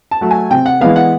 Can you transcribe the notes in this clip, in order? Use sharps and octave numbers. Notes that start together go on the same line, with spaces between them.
A5
F#3 A3
G#5
C3 G5
F#5
E3 G#3 B3 F5
F#5